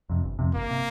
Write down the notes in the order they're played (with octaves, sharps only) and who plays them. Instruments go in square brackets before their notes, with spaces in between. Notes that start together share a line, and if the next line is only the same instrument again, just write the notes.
[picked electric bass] F2 C3
G1
F2 C3
[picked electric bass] G1 [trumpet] A#3
[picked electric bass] C3